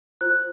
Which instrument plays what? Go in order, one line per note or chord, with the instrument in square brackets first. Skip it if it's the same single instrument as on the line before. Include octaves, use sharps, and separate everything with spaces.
[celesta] F4 C5 F#6